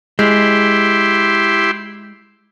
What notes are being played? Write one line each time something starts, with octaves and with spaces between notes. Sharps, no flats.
G#3 E4 G4 C6